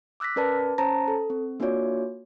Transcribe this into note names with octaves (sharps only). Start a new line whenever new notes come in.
D6 E6 F#6 A#6 B6
C#4 A#4 B4 D5 A5
C#4 C5 A5 A#5 A#6
A4
C4
A#3 D4 F4 F#4 C#5 D5